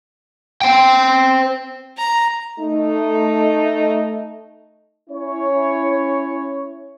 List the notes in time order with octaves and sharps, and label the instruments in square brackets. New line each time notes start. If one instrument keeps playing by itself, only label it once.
[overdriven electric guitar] C5 G5
[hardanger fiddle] A#5
[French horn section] A3 D#4
[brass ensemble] C#4 E4 C#5